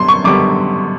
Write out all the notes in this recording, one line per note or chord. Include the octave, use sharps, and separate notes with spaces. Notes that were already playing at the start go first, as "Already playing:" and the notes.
Already playing: F#2 D3 G3 B3 C6
C#6
F#2 D3 G3 B3 D6